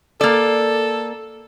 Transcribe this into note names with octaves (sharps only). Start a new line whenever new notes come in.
A#3 A4 D5